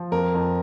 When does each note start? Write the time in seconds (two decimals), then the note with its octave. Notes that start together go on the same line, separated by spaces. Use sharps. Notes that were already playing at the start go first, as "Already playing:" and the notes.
Already playing: F3
0.12 F2 A#4
0.34 F2